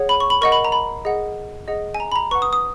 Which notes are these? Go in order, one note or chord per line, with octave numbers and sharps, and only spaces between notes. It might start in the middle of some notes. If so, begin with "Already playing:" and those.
Already playing: G#4 C#5 F#5
B5
C#6
B5
A#4 D#5 F#5 C#6
B5
A#5
B5
G#4 D#5 F#5
G#4 D#5 F#5
G#5
A#5
B5
A#5
B4 F#5 C#6
D#6
D#6